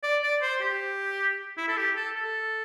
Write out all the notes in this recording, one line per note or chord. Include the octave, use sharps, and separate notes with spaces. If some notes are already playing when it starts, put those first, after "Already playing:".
D5
D5
C5
G4
E4
A4
G4
A4
A4